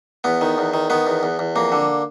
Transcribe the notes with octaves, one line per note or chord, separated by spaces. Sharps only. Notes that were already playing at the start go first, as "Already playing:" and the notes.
E2 B3
D#3
E2
D#3
D#3 B3
E2
E2
E2
F2 A#3
D3